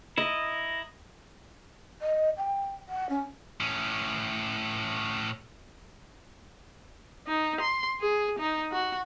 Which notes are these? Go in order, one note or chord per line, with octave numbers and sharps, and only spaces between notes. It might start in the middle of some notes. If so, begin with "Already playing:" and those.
E4 D#5 A#5
D#5
G5
F#5
C#4
A2 C#4
D#4
C6
G#4
D#4
F#4